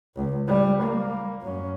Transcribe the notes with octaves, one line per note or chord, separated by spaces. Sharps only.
C#2
G3
A#3
F#2 C#4